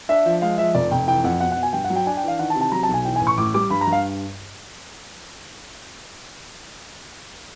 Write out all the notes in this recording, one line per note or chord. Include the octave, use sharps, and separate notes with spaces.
D4 E5
F3
G#3 F5
F3 E5
F1 D5
F1 G5
E3 G5
F2 F#5
B2 F#5
F#5
B2
G#5
G2 G5
F#5
F#3
G5
D4 G#5
G5
E3 F5
D#3 F#5
A5
C3
A5
F#3 A#5
A5
B1
G#5
E3 G5
G#5
A1
C#6
A2 D6
G3 D6
G2 B5
A#5
G2
F5